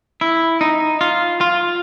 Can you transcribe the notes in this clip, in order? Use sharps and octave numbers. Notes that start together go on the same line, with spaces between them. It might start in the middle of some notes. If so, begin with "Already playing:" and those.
E4
D#4
F4
F4